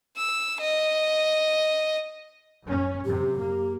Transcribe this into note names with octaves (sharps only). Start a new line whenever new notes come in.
E6
D#5
F#2 C#4
F#2 C3 G4
A#3